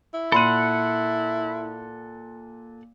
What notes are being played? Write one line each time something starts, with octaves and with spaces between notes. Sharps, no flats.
E4
A#2 A4 F#5 B5 C6 D#7